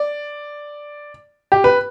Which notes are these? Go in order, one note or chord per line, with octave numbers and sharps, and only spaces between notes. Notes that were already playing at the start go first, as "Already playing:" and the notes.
Already playing: D5
G4
B4